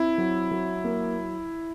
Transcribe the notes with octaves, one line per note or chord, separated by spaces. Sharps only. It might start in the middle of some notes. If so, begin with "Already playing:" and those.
Already playing: C4 E4
F#3
F#3
A#3